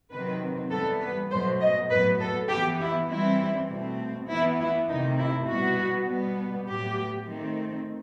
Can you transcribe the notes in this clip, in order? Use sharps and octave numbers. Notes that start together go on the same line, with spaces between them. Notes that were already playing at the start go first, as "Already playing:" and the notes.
C3 D#3 F#3 C4 B4
E3 G3 B3 A4
B4
B2 F#3 A3 C5
D#5
A2 F#3 B3 B4
A4
E3 B3 G4
E4
E3 G3 C4 E4
B2 A3 C4
E3 B3 E4
E4
C3 D#3 A3 C4 D#4
E4
B2 G3 B3 F#4
B2 G3 B3
A2 F#3 B3 G4
D#3 A3 C4